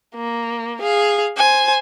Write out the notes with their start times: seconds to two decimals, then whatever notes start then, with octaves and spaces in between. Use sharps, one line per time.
0.16 A#3
0.82 G#4 F5
1.37 C5 G#5